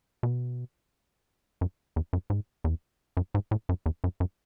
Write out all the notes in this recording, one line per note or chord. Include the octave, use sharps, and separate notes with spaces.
B2
F#2
E2
F#2
G#2
E2
F#2
G#2
A2
F#2
E2
F#2
F#2